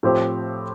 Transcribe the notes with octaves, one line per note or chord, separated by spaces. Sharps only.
A2 F3 C4 G4 C5